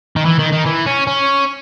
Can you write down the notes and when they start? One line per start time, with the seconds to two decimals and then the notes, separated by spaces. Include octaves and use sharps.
0.16 D#3
0.25 E3
0.39 D#3
0.53 D#3
0.66 E3
0.86 C#4
1.07 C#4